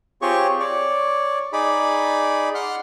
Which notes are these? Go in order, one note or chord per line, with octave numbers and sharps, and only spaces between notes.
C4 F4 G4 G#4 C#5 C#6
C#5 D5
D#4 G#4 D5 B5
F#5 C6 F6 F#6